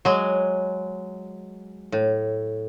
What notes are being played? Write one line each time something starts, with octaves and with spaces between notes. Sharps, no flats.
F#3 G#3
A2